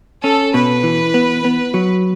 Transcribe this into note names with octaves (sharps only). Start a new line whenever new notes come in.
C#4 A4
B2 B4
E3
B3
B3
F#3